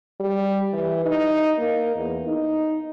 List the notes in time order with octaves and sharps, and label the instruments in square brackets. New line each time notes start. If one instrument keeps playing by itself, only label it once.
[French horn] G3
E3
D#4
A#3
E2
D#4